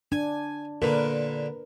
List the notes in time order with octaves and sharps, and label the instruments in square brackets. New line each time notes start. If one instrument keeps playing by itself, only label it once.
[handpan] D4 [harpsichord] G#5
[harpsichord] A#2 D3 [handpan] A#4 B4